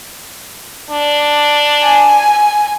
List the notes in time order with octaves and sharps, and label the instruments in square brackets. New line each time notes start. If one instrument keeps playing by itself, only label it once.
[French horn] D4
[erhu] G#5